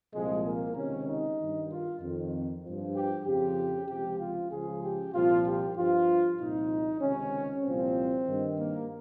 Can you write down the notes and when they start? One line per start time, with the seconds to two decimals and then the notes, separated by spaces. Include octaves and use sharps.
0.14 C2 A#2 F3 G#3
0.45 A#3
0.76 C#2 C3 D#3 C#4
1.08 D#4
1.39 G2 D#3
1.70 F4
2.02 F2 D#3
2.64 G2 F3
2.95 G4
3.26 F2 C#3 F3 G4
3.89 C#2 C3 F3 G4
4.20 F4
4.52 C#2 C#3 F3 G#4
4.83 G4
5.14 C2 A#2 F3 F4
5.45 G4
5.76 G2 F3 F4
6.39 C2 A#2 F3 D#4
7.01 C#2 C3 D#3 C#4
7.64 C2 A#2 F3 C4
8.27 G2 D#3
8.58 A#3